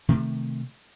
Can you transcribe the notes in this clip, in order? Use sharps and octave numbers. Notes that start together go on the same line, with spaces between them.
C3 D#3 A3